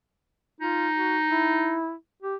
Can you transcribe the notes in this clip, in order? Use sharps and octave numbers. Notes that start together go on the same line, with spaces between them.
D#4 F4
F#4
E4
G4